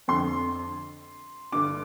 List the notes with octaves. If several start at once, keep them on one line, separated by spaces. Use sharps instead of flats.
F2 D3 C6
G2 D3 D6